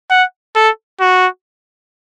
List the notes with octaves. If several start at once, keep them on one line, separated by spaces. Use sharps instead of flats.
F#5
A4
F#4